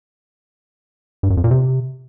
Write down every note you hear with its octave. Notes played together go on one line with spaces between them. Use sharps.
G2
F#2
F2
A#2
C3